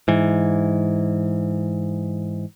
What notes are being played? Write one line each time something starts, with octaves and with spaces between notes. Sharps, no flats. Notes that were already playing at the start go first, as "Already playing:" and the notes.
G#2 E3